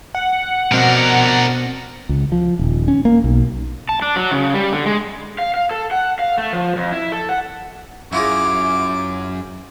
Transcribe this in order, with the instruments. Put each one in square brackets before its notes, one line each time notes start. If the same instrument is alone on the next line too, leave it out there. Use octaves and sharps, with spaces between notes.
[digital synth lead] F#5
[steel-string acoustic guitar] B2 C4 [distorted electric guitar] D4 A#4
[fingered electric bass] C#2
F3
D#1
C#4
A#3
B1
[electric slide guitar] A5
D4
F#3
C#3
G3
D3
G#3
F5
F5
A4
F#5
F5
A3
F3
F2
E4
A4
F#5
[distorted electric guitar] F#2 [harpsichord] E4 F4 G#4 [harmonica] D6